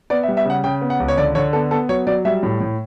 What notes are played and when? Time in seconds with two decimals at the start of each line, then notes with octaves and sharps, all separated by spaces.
0.10 B3 D5
0.23 E5
0.28 G3
0.37 E5
0.45 C#3 F#5
0.64 C#3 G5
0.82 B3
0.90 F#5
1.00 C#2
1.08 C#5
1.17 D3 D5
1.35 D3 C#5
1.53 B3 A4
1.71 B3 A4
1.89 F#3 C#5
2.07 F#3 D5
2.25 G3 E5
2.43 A2
2.60 A2